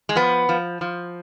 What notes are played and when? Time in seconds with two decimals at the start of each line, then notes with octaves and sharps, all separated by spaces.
0.09 G#3
0.15 F3 B3
0.49 F3
0.81 F3